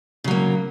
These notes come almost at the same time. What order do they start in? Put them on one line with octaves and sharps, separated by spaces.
C#3 F#3 A#3